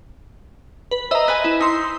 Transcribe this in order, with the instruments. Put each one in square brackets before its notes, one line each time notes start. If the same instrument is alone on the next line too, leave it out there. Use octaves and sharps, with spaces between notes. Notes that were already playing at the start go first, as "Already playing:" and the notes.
[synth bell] B4
[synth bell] C5 D#5 E5 [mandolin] A#5 E6
[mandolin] B4 G#5
[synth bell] E4
[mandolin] D#4 [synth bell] C6 E6